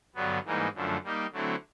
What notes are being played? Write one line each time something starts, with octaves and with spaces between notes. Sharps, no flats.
G2 D3 F#3 B3
G#2 E3 G3 A#3 D#4
F#2 D3 F3 A3
G3 A#3 D#4 G4
D3 F#3 A3 C4 E4